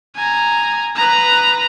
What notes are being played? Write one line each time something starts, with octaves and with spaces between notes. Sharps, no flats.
G#5 A#5
B4 A#5